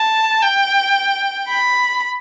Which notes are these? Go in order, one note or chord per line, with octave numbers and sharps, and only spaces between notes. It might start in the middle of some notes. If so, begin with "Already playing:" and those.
Already playing: A5
G5
B5